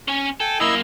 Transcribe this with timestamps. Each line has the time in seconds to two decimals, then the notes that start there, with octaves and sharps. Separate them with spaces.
0.08 C#4 G#5
0.40 A4 G5 G#5
0.60 F#2 A#3 E4 D#5 E6